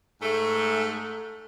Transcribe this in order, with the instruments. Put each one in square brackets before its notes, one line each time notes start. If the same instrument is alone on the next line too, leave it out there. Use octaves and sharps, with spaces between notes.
[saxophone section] G#2 A3